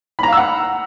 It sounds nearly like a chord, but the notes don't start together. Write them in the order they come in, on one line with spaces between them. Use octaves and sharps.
B5 A#5 F5 E6 F#5